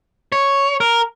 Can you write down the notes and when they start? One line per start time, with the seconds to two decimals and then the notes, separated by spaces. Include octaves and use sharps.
0.32 C#5
0.80 A#4